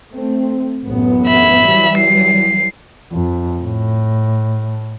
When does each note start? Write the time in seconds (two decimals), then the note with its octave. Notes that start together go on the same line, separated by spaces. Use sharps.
0.13 A3 C4
0.86 A1 F#2 B3
1.27 E5 B5
1.65 E3 F#3 G3
1.98 C7
3.12 F2
3.62 A2